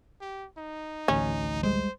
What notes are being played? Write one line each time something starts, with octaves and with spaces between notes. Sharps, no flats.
G4
D#4
A1 D2 C#4
G3 G#3 C5